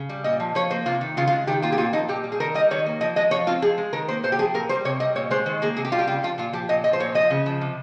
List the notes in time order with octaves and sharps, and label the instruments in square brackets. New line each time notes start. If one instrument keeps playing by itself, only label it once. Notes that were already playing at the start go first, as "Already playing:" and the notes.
Already playing: [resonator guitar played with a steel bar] C#3
G3
A#2 D#5
F3
F3 C#5
A#3 C5
C3 F4
D#3
C#3 F4
F4
G#3
D#3 G4
A#3 F4
G4
A#2 F4
F3 D#4
A#2 G4
G3
G#4
D#3 A#4
G3 D#5
D#3 C#5
A#3
F3 D#5
G#3 D#5
F3 C#5
C4 F4
F3 G#4
G#3
D#3 A#4
A#3 C5
A#2 C5
G4
F3 G#4
A#2 A#4
G3 C5
C3 C#5
G3 D#5
A#2 C#5
G#3 C5
D#3
A#3 G#4
C3 G#4
G4
G3 F4
G4
C#3 F4
F3 F4
A#2 F4
F3 G4
A#2 D#5
F3 D#5
C5
A#2 C#5
F3 D#5
C#3
F3
C3